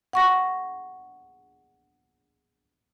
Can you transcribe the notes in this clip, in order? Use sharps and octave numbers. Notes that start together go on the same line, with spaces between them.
F#5 C#6 A#6